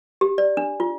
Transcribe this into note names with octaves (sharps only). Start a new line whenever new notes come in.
G4
D5
D4
F4